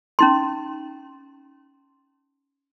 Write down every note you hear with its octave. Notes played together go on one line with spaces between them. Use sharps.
C#4 D#4 C6